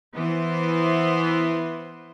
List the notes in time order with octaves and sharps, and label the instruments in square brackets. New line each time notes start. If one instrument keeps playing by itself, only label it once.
[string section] E3 B3 C5